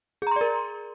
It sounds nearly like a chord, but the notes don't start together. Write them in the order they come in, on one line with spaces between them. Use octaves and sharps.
G#4 A#5 C6 D5 A#4